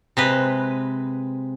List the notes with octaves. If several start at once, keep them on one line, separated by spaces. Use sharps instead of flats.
C3 G#3 B4